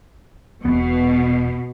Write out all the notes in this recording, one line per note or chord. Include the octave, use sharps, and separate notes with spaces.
E1 B2 B3